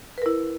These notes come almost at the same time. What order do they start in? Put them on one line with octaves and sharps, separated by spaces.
B4 A#4 E4